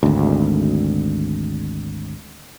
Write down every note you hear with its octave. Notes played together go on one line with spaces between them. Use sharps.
G#1 D2